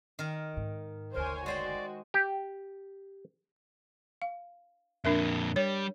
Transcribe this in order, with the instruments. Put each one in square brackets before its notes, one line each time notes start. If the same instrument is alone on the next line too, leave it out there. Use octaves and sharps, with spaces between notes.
[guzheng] D#3 A#4
[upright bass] G#2
[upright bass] F#1 D2 [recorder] A#4 [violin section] C5 C#5 G#5
[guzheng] G#3 C5 G5 [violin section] F#4 [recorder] D5
[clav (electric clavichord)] G4
[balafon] F5
[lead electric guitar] F2 A#2 [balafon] D4 A#4 E5
[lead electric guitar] G3 [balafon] C#5